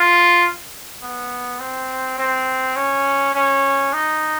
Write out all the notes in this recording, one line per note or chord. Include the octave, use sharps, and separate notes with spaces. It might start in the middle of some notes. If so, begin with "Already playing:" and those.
Already playing: F4
B3
C4
C4
C#4
C#4
D#4